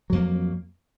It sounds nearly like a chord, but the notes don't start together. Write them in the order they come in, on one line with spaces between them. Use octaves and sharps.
F#3 F2 A#3